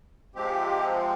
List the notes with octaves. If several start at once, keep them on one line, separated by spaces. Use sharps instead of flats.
C3 F3 G#3 C4 G4